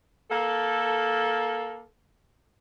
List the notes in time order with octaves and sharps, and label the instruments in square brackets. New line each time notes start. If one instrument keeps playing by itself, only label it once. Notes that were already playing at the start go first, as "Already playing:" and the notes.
[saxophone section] A#3 A4